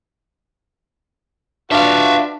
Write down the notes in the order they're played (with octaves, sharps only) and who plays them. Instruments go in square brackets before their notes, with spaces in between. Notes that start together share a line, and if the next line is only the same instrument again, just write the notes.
[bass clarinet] D4 [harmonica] F4 F#4 B4 [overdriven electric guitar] E5 F5